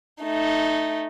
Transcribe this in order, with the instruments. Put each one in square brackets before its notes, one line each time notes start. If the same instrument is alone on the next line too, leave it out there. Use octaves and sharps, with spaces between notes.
[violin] A3 D#4